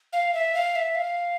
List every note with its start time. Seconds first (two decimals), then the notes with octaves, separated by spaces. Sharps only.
0.13 F5
0.34 E5
0.54 F5
0.75 E5
0.95 F5